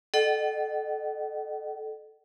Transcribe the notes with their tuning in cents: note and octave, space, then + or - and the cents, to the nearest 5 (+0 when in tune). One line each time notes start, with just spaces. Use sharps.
A4 -20 D#5 -45 F#5 +40